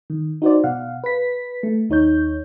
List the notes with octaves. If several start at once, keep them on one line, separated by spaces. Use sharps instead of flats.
D#3
D#4 F#4 C5 D5
B2 F5 F#5
B4 B6
A3
D#2 D#4 C#5 G6